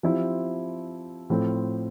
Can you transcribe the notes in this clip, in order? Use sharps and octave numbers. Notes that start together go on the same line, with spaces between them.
F3 C4 E4 G4
A2 F3 C4